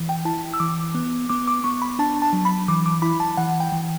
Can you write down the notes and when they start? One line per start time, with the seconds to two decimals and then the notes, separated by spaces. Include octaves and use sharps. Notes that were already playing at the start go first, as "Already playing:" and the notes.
Already playing: E3
0.09 G5
0.25 E4 A5
0.54 E6
0.60 E3 D6
0.95 B3
1.29 B3 D6
1.47 D6
1.64 B3 C#6
1.82 B5
1.99 D4 A5
2.22 A5
2.33 F#3
2.45 B5
2.68 E3 D6
2.86 D6
3.02 E4 B5
3.20 A5
3.37 E3 F#5
3.60 G5
3.72 E3